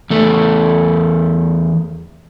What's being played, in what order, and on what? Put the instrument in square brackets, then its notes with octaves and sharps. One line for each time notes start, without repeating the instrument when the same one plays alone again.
[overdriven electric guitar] E2 A3